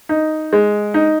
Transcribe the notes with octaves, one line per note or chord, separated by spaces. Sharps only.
D#4
G#3
D#4